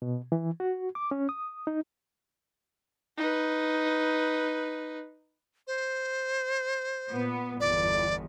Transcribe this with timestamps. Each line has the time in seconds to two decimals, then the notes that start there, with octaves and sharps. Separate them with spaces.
0.02 B2
0.32 E3
0.60 F#4
0.95 D6
1.11 C#4
1.29 D#6
1.67 D#4
3.17 D#4 B4
5.67 C5
7.09 A#2 B3
7.60 G1 E2 D5